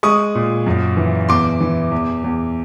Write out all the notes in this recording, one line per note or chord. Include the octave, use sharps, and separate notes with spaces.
G#3 C#6 D#6
A#2
F#2
E3
E2 C6 D6
E3
E2
E2